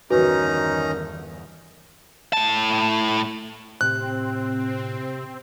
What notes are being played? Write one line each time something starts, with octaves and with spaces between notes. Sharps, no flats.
G1 E2 D#3 C#4 D#4 F#4 B4 A#5
A2 A5
A2 C3 C4 F#6